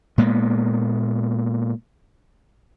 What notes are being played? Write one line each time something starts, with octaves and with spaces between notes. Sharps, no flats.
A#2 G#3 A#3 B3